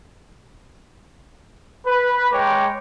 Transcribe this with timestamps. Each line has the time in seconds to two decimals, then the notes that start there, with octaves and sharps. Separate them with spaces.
1.86 B4
2.32 G#3 C#5 G5 A#5 D6